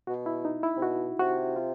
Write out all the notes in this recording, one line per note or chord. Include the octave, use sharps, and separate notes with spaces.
B2 F#4
E4
D#4
E4
C3
B2 F#4
C3 F#4
F4